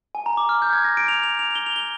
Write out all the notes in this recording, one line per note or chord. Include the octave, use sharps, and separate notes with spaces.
G#5
A#5
D6
F6
G6
G#6
A#6
D7
F7
F7
F7
G7
F7
G7